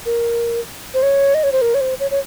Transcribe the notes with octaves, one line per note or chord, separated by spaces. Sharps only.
A#4
C5
C#5
D#5
C#5
C5
A#4
C#5
C5
C#5
C#5